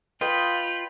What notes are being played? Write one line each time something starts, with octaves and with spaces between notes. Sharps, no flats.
F4 B4 D#5 G5 B5 G6